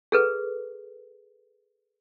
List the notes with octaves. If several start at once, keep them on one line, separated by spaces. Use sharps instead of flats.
G#4 A4 B4